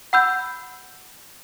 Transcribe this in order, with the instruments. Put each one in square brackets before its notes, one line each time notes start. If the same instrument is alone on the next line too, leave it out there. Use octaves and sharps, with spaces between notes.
[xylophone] F#5 B5 E6 G6